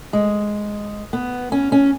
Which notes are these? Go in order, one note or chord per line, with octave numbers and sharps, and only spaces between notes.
G#3
B3
C#4
C#4